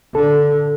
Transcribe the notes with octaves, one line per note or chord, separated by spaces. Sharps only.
D3 A4